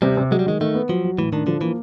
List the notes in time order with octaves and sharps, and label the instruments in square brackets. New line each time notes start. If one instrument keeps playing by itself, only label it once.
[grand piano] C3 [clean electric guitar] G3
[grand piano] C3
[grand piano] F#3 [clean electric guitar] G#3
[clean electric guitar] G3
[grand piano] D#3 [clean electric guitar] G#3
[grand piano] D#3 [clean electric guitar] A3
[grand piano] B3
[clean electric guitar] F3 [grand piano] F#3
[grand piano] F#3
[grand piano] A2 [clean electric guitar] E3
[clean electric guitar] D#3 [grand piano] D4
[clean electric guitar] D3 [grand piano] F3
[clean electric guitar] E3 [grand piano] A#3